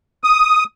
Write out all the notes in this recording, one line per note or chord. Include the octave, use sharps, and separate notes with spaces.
D#6